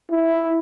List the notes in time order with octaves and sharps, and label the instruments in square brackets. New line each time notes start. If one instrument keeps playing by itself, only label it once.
[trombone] E4